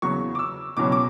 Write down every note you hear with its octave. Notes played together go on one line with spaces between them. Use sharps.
E2 C#3 F#3 C#6
D6
E6
C#2 B2 F#3 C#4 D6
D6